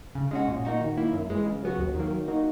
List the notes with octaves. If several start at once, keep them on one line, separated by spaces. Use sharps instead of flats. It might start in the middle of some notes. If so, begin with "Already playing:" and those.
C#3
G#3 C#4 F#4
A#2
A#3 D#4 F#4
D#3
A#3 E4
F#2
E3 G#3
C#3
F#3 B3 F#4
D#2
D#3 F#3 A#3
D#3
A#3 D#4 F#4